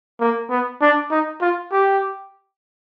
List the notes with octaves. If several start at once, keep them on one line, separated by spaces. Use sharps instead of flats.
A#3
B3
D4
D#4
F4
G4